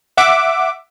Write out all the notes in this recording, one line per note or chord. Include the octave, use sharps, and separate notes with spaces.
E5 F#5 D6